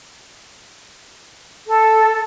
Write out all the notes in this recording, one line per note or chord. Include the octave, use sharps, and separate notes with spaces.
A4